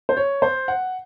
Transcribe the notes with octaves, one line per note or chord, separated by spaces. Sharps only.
C5
C#5
C5
F#5